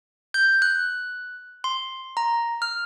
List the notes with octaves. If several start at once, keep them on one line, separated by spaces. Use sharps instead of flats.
G6
F#6
C6
A#5
F6